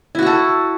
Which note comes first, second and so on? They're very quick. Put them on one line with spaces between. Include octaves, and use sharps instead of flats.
E4 F#4 F#5 A4